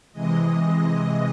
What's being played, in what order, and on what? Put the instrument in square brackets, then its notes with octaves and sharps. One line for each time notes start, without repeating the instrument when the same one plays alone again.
[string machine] C3 E3 G#3 D#5